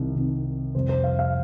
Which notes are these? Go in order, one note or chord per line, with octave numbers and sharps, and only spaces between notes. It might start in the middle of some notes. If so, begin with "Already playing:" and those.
Already playing: C2 C3 D#3
C2 C3 D#3
F1 F2 C3 G3 C5
C5
F5
F5